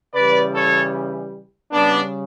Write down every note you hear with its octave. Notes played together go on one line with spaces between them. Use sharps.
C#3 E3 G3 B4 D5
A4 C#5
C#3 G3 B3 D4